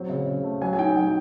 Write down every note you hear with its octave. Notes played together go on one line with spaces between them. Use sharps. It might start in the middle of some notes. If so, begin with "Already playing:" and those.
Already playing: F#3 C4
C#3
C#3
A3
F#3 G#5
G#5
D#4 G5
F#3 G5